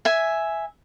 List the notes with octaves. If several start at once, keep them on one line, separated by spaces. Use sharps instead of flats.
E5 G#5